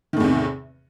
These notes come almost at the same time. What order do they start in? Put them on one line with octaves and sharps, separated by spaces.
D#3 A2 E2 C3